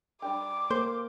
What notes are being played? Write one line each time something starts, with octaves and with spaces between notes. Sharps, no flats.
G3 D4 G4 D6
A#3 A#4 C5